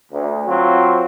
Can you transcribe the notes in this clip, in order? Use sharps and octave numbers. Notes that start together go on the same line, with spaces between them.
D2
F#3 C4 F4